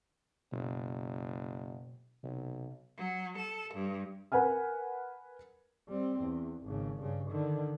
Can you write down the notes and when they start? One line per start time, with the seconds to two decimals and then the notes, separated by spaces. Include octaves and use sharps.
0.52 F#1 B2
2.23 B1 C3
2.97 F#3
3.38 A4
3.74 G2
4.32 A#4 B4 F#5 G#5 F6
5.89 G3 C4
6.21 E2
6.64 G#1 C#3
7.00 G2 C#3
7.31 D3 D#3